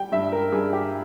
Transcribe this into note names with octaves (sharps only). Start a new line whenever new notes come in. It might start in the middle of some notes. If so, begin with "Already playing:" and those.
Already playing: G3 G5
G2 E5
A#4
G2 G#4
G4